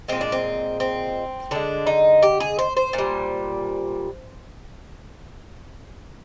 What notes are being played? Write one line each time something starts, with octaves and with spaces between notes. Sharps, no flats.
A#2 G#3 C4
D4
C4
C4
D3 G#3 D4
D#4
G4
G#4
C5
C5
A#2
G3